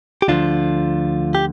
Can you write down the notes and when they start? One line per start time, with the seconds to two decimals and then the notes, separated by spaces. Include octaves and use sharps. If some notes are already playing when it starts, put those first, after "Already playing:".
0.22 G4
0.28 D2 D3 F3 D4 F4
1.35 G4